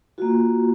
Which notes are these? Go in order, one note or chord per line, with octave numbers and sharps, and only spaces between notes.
A#3 F4 F#4